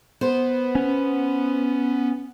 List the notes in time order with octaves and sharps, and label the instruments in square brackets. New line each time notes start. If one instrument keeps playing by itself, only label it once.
[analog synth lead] B3 [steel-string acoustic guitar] C5
[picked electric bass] C#4